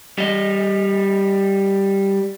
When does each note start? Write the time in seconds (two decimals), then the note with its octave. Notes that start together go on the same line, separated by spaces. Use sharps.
0.18 G3 D#5